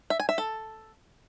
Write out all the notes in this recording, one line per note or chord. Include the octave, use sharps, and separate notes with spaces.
E5
G#5
E5
A4